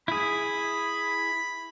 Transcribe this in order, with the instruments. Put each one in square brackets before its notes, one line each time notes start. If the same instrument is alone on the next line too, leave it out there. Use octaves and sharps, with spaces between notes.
[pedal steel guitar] E4 G#4 [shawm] B5